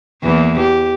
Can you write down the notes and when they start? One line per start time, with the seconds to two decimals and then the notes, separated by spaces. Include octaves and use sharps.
0.23 E2 E3 A#3
0.58 G4